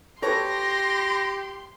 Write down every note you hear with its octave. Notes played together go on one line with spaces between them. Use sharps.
G4 A4 B4 C#5 C6 A#6